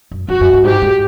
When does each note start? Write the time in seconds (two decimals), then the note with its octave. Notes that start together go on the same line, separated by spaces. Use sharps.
0.11 F#2
0.29 F2 F#4
0.41 F#2
0.53 G2
0.64 G#2 G4
0.82 G#2